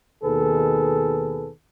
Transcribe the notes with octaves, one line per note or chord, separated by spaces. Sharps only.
D#2 B2 D#3 G#4 A4 B4